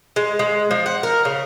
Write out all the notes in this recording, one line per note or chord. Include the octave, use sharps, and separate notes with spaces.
G#3
G#3
F3
F#5
A#4
C#3